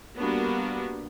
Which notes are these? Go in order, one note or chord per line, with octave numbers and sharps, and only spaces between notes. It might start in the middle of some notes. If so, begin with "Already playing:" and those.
G3 A#3 B3 D4 F#4